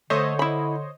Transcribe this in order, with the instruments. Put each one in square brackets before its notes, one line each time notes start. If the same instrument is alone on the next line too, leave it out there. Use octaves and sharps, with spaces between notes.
[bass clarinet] D3 [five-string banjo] A3 [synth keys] C5 C#5 D#5
[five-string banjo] E4 B5